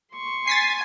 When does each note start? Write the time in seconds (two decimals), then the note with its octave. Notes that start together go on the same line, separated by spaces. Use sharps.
0.12 C6 C#6
0.47 G#5 A6 B6 C7